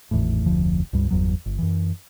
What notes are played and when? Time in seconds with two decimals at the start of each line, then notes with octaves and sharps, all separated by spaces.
0.11 G#1 E2 A2
0.46 F1 D2 F3
0.93 C#2 G2 G3
1.11 G1 E2 F#3
1.46 G1
1.58 F#2 E3